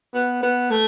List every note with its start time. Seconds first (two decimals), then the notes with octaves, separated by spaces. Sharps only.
0.14 B3
0.43 B3
0.70 A3